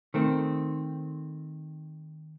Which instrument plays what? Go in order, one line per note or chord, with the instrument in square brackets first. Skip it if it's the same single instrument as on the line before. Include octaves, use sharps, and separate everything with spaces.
[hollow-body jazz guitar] D#3 A3 C4